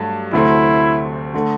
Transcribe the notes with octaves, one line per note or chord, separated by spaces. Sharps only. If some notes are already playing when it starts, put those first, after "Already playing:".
Already playing: G2 F#3 A3
D2 C3 F#3 A3 C4 E4
D3 A3